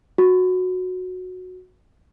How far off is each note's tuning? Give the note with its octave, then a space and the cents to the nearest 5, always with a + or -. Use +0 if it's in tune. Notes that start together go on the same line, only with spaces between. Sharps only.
F#4 -10